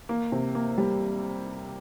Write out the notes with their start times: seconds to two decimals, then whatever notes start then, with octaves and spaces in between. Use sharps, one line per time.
0.09 A#3
0.32 C3
0.55 A#3
0.78 G3